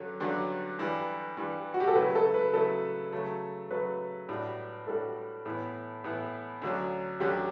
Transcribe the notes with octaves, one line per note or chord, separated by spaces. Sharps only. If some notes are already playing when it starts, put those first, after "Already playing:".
Already playing: G2 D3 F#3 C#4 A4
G2 D3 F#3 C#4
G2 E3 G3
G2 E3 G3
F#4
G4
A4
C#3 F#3 A3 E4 B4
A4
B4
C#3 F#3 A3 E4 A4
C#3 F#3 A3
C#3 F#3 A3 B4
A2 G3 D4 F#4
A2 G3 D4 F#4 A4
A2 E3 B3 E4
A2 E3 B3 E4
D2 D3 F#3 C#4
D2 D3 F#3 C#4 G4